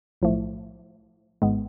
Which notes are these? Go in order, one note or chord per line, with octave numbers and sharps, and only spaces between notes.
B1 A2 F3 A3
G#1 G#2 G#3 B3